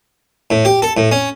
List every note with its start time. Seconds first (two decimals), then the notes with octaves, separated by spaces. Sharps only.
0.51 A2
0.65 G4
0.82 A4
0.97 A2
1.11 C#4